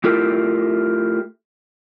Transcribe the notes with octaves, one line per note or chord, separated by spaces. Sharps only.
A3 E4 F4 G4 A4 A#4